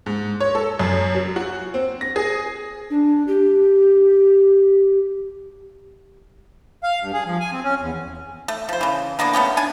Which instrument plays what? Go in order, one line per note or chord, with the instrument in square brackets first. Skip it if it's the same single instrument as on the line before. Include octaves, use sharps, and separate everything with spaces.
[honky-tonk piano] G#2
C#5
A4
F#2
F#3
F#4
C4
A#6
G#4
[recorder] D4
G4
[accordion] F5
G2
G#4
F3
G#5
C4
C#4
E2
[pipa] A3
F3 C5
C#3 E3
D3 A#3 B3 D4
A3 B3 C#4 G4
D4 G#5